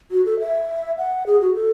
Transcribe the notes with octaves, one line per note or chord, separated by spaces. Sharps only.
F#4
A4
E5
F#5
G#4
F#4
A4